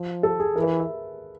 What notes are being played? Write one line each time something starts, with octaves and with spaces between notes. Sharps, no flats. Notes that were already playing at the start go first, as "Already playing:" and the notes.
Already playing: F3
A4
G#4
E3 A#4
B4
E5